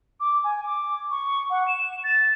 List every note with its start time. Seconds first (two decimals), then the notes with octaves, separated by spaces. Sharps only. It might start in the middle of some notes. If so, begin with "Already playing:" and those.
0.20 D6
0.44 G#5
0.66 D6
1.11 C#6
1.50 F#5
1.68 E7
2.04 A6